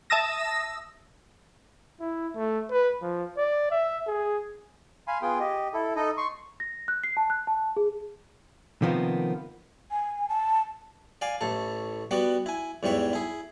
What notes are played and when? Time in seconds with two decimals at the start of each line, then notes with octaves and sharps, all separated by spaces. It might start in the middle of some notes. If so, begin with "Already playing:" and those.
0.10 E5 A5 D#6 E6 A#6
2.00 E4
2.36 A3
2.71 B4
3.02 F3
3.37 D5
3.71 E5
4.07 G#4
5.07 F5 G#5 B5 C6
5.22 B3 F4 G#4 G5
5.40 G4 D#5
5.74 E4 A4
5.96 D#4 A4 D#5
6.17 C6 C#6
6.60 A#6
6.88 F#6
7.03 C7
7.17 A5
7.30 F#6
7.47 A5
7.77 G#4
8.82 C3 D#3 F3 A#3 B3
9.91 G#5
10.29 A5
11.21 D5 F5 G#5
11.41 A1 A2 A4
12.11 G3 B3 F#4 D5 F#5
12.46 E4 G#5
12.83 E2 G#2 G3 C#5 E5
13.13 E4 G#4